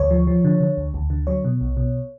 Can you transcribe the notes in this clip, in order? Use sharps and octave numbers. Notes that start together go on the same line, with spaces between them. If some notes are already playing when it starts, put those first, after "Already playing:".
Already playing: D2 C#5
F3
F3
D3
D3
D2
D2
D3
F#3 C#5
B2
B1
B2